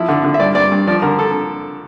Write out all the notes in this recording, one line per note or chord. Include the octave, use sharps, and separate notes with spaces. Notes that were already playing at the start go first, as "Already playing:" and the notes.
Already playing: F3 E4
D3
D3
E5
G2 D5
G2 D5
G2
F3 D5
D3 A#4
A4